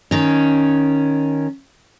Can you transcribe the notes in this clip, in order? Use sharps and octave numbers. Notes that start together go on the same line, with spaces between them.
D#3 C#4